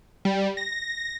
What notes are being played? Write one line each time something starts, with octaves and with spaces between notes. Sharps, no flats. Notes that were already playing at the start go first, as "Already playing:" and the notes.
G3
A#6